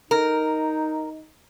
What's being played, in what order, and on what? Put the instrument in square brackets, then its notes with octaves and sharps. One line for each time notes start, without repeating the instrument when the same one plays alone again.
[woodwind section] D#4 [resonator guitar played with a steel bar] A#4